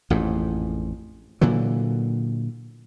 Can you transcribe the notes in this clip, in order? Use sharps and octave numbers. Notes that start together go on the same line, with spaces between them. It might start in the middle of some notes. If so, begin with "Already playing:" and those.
A1 F2 G#2
A#2 D3 E3 F#3